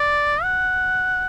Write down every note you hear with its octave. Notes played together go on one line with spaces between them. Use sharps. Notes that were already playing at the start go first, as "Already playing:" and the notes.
Already playing: D5
F#5